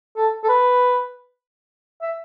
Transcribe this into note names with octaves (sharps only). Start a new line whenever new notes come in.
A4
A4
B4
E5